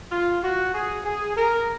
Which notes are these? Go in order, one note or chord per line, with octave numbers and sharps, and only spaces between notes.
F4
F#4
G#4
G#4
A#4